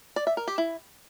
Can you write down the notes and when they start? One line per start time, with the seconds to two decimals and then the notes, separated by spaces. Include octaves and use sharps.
0.16 D5
0.27 E5
0.37 A#4
0.48 G4
0.58 E4